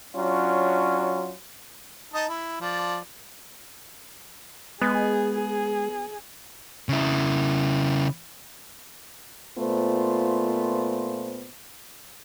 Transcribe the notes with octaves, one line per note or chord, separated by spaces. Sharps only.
F#3 C#4 D4 F4
D#4 D#5 A5
E4
F3 D5
G#3 B3 G#4
G#4
C#3 E4
A#2 A3 B3 F4 C5